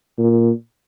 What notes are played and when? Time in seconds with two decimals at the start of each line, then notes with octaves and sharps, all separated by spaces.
0.18 A#2